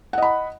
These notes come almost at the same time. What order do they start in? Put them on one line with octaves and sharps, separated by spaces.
F#5 D#5 B5